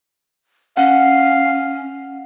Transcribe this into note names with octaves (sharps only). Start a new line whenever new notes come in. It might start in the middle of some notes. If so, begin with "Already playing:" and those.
C#4 F5 F#5